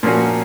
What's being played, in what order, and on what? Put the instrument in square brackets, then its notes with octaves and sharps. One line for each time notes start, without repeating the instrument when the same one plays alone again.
[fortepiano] A#2 F3 A#3 C#4 F#4